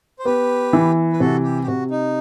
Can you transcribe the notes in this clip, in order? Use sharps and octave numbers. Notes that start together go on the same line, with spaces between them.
C5
B3 G4 B4
E3
B4
C3 F#4 A4
G4
G4
C3 F#4
D#4